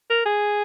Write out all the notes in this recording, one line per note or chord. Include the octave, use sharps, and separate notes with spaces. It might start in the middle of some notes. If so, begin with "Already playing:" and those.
A#4
G#4